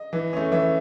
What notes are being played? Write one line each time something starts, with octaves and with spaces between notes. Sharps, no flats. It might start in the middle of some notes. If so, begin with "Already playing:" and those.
Already playing: D#5
E3
A3 C#4
E3 E5